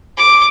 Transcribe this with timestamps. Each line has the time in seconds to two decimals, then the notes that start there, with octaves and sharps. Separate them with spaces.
0.17 D6